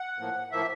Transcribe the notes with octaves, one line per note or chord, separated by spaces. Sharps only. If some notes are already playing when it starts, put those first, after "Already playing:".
Already playing: F#5
A2 F3 A#3
A2 F3 A#3 E5